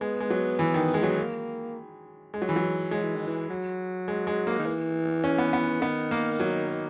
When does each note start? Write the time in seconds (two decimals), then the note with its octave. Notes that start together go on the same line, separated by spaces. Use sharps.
0.01 G#3 B3
0.20 G#3
0.30 F#3
0.59 E3
0.74 D#3
0.94 G#3
1.03 F#3
1.18 A#3
2.34 G#3
2.42 F#3
2.49 E3
2.56 F#3
2.91 F#3 G#3
3.03 E3
3.15 D#3
3.27 E3
3.50 F#3
4.08 G#3
4.27 G#3
4.47 A#3
4.59 D#3
4.66 E3
5.24 C#4
5.38 B3
5.53 B3
5.82 D#3 B3
6.11 A#3
6.40 F#3